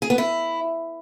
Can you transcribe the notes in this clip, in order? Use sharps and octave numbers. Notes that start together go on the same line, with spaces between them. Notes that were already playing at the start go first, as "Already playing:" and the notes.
G#4
B3
E4